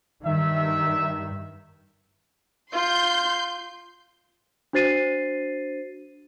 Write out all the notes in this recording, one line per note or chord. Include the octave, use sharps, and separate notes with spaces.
G2 D#3 E5
F4 C6 G6
D4 F#4 C5 A6 C7 D#7